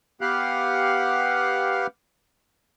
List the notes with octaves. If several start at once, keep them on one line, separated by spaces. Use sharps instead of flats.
B3 G4 F5 F#5